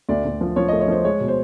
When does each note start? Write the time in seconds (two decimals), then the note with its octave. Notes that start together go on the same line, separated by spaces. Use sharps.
0.09 D2 D5
0.25 D2
0.41 F3
0.56 F3 C#5
0.68 A3 D#5
0.81 C#5
0.88 F3 C5
1.04 G#3 C#5
1.20 B2
1.28 C5